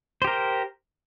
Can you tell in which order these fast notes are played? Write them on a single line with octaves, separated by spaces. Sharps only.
C5 G4 A#4